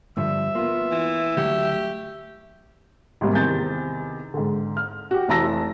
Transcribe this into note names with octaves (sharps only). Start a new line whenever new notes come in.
G2 D3 F3 E5
A#3 B3 F4
E3
D2 F#3 A3 G4 F#5
G#1 C3 G3 A#3
E2 C3 D#3 G6 A6
G#2 D3
F6
F#4 G4
F1 E3 A5 A#5 E6 A#6